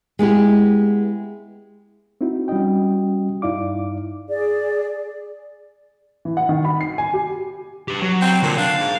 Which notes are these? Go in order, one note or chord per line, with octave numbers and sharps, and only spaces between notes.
G#3 B3 E4 G4
C4 D#4 E4 F#4
G3 C#4 F#4 D#5 G5
G2 D#4 E4 D5 F5 D6
G#4 D5
E3
F#5
D#3
B5
C7
G#5
G4
G4 B4
F#3
C4
A#2 D3
D4 F5
G#2